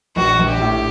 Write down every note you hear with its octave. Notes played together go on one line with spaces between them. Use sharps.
A#1 F#4
A#1
G4
A2